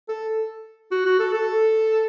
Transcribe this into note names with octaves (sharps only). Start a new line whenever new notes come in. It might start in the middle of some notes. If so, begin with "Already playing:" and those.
A4
F#4
F#4
A4
A4